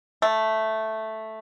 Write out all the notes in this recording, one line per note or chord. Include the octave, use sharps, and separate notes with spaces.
A3